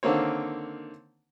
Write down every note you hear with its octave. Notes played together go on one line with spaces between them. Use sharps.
D3 D#3 A#3 C4 C#5